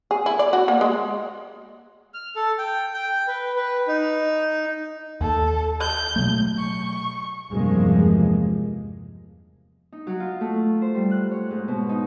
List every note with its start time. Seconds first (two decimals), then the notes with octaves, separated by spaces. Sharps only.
0.11 G#4
0.26 E4
0.39 D5
0.53 F#4
0.68 A#3
0.81 G#3
2.14 F6
2.36 A4
2.58 G5
2.94 G5
3.27 B4
3.56 B4
3.88 D#4
5.21 D#2 A4
5.80 G6
6.16 B2 F#3 A3
6.57 C#6
7.51 E2 G2 C3 F3 G#3 A#3
9.92 D#4
10.07 F#3
10.20 F4
10.41 A3
10.82 C5
10.95 G3
11.11 F#6
11.31 C#5
11.51 G#2
11.68 B2
11.89 D#4